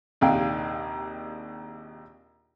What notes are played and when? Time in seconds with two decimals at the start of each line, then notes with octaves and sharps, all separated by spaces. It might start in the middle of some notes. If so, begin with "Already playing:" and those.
0.21 A#1 D#2 C3 F5 G5